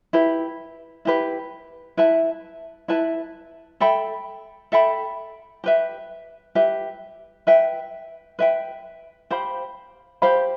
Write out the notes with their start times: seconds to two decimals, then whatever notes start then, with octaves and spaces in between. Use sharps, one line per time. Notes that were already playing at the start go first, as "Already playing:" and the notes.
0.13 E4 G4 B4
1.05 E4 G4 B4
1.97 E4 B4 E5 A5
2.88 E4 B4 E5 A5
3.80 A4 E5 G5 B5
4.72 A4 E5 G5 B5
5.64 G4 B4 E5
6.55 G4 B4 E5
7.47 B4 E5 G5
8.39 B4 E5 G5
9.30 G4 C5 F5 B5
10.22 G4 C5 F5 B5